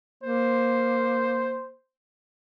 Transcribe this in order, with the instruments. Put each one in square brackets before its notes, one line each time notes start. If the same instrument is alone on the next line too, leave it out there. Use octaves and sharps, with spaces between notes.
[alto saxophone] A#3 [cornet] C5